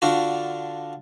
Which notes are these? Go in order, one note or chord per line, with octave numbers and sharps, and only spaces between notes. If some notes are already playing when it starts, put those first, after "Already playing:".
D3 D4 F4 F#4